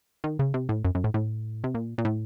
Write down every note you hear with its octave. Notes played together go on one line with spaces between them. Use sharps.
D#3
C#3
C3
A2
F#2
F#2
A2
A2
C3
A#2
A#2
A2